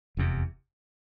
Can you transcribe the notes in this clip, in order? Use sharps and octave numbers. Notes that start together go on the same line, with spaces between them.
F1 E2 C3